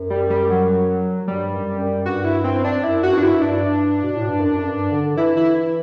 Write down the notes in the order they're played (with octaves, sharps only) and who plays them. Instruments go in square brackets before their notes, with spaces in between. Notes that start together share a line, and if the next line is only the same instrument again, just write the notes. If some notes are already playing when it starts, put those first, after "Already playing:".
Already playing: [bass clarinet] F#2
[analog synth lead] G3
G3
F#3
[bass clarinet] G2 [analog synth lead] G3
[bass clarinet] F#2
F#2
[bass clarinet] G2 [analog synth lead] F#4
[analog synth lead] E4
C4
D4
[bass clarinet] F#2 [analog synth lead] E4
[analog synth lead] F#4
[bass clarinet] G2
[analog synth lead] D4
E4
[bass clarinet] G2
[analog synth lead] D4
[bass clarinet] G2
B2
A2
G2
F#2
G2
D3
[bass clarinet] E3 [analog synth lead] E4
[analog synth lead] E4